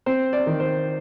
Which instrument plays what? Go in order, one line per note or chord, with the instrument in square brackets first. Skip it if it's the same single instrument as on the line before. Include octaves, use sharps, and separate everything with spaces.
[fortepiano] C4 C5
D5
D#3
C5